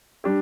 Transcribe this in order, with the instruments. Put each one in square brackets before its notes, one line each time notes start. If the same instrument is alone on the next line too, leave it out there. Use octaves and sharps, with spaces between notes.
[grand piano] G3 D4 G4